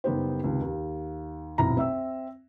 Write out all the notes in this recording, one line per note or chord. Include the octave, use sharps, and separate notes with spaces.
F#1 G3 B3 D#4 G4 C5
C#2 C3 D#3
D#2
D#1 B1 F2 E4 A#5
C4 E5 E6